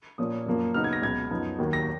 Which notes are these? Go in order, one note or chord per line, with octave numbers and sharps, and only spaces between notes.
A#2 F3 A#3 C#4 D#6
F#2 F3 A#3
C#3 F#3 B3 D#4 F6
G#6
A#6
C#2 B2 F#3 G#6
F#2 F3 B3 D#4
D#2 D#3 F#3
A#6